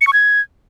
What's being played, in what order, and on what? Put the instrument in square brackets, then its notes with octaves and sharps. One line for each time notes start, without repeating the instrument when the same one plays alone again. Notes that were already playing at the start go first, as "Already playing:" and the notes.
[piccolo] C#7
C#6
G#6